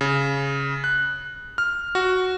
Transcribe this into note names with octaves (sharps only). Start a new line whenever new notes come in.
C#3
F#6
F6
F#4